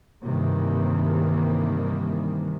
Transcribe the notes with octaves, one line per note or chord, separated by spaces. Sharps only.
G2 C3 D#3 E3 A#3